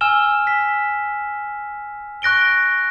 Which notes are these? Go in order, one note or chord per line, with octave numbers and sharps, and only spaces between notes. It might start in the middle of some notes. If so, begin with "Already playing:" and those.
G#5 E6 F6 E7 G7
B6
C#6 F#6 A#6 D7 G7